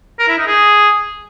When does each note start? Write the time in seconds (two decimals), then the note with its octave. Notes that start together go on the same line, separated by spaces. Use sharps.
0.19 A#4
0.28 E4
0.38 D#4
0.47 G#4